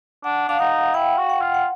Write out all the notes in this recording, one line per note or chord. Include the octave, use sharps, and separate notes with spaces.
D4 F#5
D4 F5
D#4 F#5
E4 G5
F#4
F#5
F4
F#5